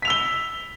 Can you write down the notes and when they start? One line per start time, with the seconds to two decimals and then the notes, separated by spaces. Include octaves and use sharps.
0.02 B6
0.05 F7
0.08 E6
0.10 G7